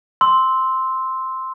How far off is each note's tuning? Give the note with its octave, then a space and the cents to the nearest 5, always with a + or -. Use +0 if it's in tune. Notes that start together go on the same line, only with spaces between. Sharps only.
C6 +0 E6 -15